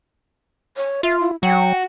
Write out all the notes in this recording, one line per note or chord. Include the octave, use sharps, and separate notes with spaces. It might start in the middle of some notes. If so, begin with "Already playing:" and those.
C#5
F4 E5
E4
F#3 F#4 G5